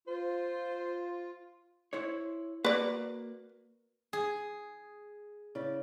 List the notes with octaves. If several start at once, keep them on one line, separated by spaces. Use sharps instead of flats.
F4 C5
E4 C5 C#5
A#3 F#4 A#4 B4 D5
G#4
C#3 E4 D5